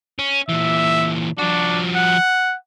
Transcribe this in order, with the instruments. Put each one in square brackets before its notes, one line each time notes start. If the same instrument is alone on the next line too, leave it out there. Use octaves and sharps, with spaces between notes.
[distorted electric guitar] C#4
[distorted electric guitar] A#2 E3 [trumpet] E5
[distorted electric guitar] F3 F#4 [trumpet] D4
[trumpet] F#5